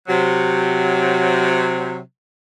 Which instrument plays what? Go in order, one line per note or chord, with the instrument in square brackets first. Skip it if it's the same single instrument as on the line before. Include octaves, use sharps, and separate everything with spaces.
[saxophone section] C3 F#3